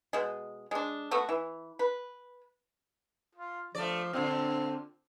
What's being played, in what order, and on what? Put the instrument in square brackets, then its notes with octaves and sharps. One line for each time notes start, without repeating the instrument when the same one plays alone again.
[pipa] B2 G#3
G#3 D4
A3 B3 F#4
E3
B4
[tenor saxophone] F4
[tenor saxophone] F3 [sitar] A3 D5
[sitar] A#2 D3 [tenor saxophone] C4